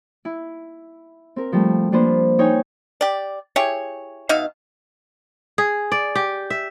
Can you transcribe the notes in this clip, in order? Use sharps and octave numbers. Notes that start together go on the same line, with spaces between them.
E4
C4 A#4
F3 G3 A3
F3 A#3 D4 F4 B4 C5
D#4 C#5 G5 G#5
G4 D5
E4 G4 G#4 C#5
B2 D#4 E5 F5
G#4
D5
G4
E5